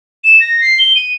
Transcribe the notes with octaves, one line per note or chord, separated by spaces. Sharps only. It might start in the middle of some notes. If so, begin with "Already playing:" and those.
E7
A#6
C7
G7
D#7